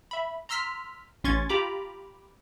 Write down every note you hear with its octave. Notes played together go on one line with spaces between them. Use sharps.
E5 B5
A#5 C6 E6 F6 B6
A1 C#4 C6 C#6 G#6 A6
F4 G4 A#5 B5 D6